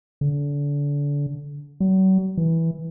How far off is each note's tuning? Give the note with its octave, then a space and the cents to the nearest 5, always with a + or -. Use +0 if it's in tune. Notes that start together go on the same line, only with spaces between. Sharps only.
D3 -30
F#3 +40
E3 -10